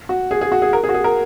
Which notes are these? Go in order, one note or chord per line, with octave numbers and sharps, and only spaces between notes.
F#4
G#4
G#4
F#4
G#4
A#4
G#4
F#4
G#4
A#4